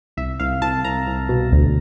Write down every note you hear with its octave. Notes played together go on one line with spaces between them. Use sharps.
C2 E5
C2 F5
C2 A5
C2 A#5
C2
B2
D2